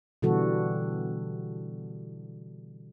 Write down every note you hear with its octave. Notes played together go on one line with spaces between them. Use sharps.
B2 D3 E3 G3 F#4 A4